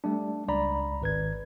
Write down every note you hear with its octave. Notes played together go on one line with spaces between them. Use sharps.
G3 A3 D4
C#2 D5 A#5 B5
G#1 B4 G#6